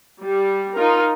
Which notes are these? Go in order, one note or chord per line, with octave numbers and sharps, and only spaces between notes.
G3
D#4 F4 A#4